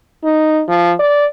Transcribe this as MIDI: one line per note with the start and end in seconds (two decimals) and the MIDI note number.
0.24 0.62 63
0.68 0.93 53
0.99 1.26 74